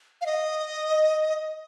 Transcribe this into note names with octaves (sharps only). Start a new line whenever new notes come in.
F5
D#5